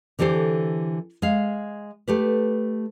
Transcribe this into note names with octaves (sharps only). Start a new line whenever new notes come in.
D3 E3 G4 A4 C5
G#3 F5
A3 G4 B4